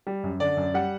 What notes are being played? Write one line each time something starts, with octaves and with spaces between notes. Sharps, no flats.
G3
F#2
D3 D5
F#2
G3 F#5